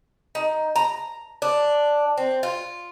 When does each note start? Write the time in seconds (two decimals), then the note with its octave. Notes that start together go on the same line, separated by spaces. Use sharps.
0.35 D#4
0.76 A#5
1.42 D4
2.18 C4
2.43 F4